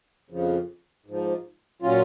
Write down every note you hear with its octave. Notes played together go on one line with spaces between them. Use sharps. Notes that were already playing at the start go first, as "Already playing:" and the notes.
F2 C#3 F3
G#2 F3
A#2 F#3 C#4 F4